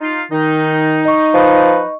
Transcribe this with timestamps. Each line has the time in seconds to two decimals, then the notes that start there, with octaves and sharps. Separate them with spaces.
0.01 D#4 F4
0.32 D#3 D#4
1.05 D#5 C#6
1.35 F3 B4